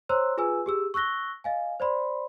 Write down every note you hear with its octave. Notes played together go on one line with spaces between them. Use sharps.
C5 C#5 A#5 C6 E6 F#6
F4 G#4 B4 G#5 E6
G4 G#4 E6
C#6 E6 F#6 A#6 G7
D#5 F5 G#5
C5 D5 B5 C6